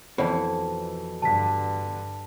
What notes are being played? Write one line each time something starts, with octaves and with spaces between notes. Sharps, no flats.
F2 B2 E3
G2 D3 A5 B6